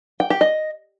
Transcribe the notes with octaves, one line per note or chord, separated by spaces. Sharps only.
G5
G4
D#5